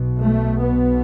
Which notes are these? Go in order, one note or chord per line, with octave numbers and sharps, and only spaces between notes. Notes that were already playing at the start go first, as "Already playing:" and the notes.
Already playing: B1 B2
A3
B3